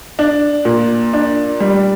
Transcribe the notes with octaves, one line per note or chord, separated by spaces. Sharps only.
D4
A#2
D4
G3